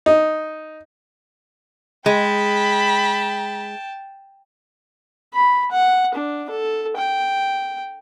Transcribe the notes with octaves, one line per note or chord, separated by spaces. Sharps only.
D#4
G#3 G5 A5 B5
B5
F#5
D4
A4
G5